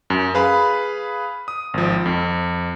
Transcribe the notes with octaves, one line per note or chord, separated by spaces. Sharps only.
F#2
G#4 B4 F5 B5
D#6
G#1 F3
F2